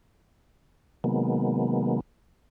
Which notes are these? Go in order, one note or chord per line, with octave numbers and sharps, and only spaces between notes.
C3 D#3 F#3 G#3 A#3 B3